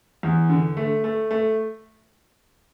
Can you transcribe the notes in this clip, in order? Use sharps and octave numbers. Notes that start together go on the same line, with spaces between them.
E2
D3
A3
A3
A3